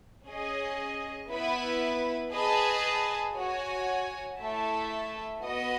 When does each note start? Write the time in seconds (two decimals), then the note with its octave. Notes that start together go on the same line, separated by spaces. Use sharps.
0.26 C#4 G#4 D#5
1.29 B3 E4 B4
2.33 G#4 B4 D#5 A5
3.36 F#4 C#5 G#5
4.39 A3 E4 A4 E5 A5
5.42 B3 F#4 B4 D#5